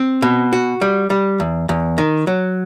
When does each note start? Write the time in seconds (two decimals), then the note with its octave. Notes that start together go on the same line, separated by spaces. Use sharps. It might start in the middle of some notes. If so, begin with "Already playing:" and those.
Already playing: C4
0.22 B2
0.53 F#4
0.81 G3
1.10 G3
1.40 E2
1.69 E2
1.98 D#3
2.27 F#3